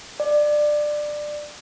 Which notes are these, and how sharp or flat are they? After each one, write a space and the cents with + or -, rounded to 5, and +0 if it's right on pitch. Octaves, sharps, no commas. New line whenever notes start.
D5 +20